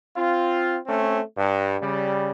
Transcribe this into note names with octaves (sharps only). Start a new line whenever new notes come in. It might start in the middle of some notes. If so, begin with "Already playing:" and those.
C4 F4
A3 C4 C#4
G2
C#3 G3